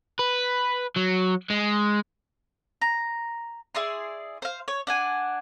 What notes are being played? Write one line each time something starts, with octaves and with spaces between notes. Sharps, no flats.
B4
F#3
G#3
A#5
E4 G#4 D5 C6
C5 F5
C#5
D4 F#5 G#5